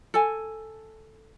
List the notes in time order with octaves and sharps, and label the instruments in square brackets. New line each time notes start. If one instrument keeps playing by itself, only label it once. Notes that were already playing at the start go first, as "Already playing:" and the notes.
[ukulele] A4 G#5